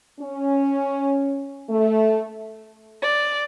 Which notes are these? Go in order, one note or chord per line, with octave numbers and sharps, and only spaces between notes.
C#4
A3
D5